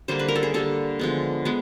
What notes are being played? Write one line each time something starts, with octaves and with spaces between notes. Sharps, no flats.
D3 G3 A#3 C5
B4
A#4
A4
G#4
D3 G3 A#3 A4
D3 F3 G#3 B3
G#3 B3